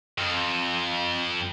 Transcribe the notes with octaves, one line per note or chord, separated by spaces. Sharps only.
F2